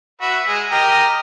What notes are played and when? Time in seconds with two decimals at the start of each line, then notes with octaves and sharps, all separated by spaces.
0.21 F#4 B4 E5
0.48 G#3
0.72 G4 A#4 D#5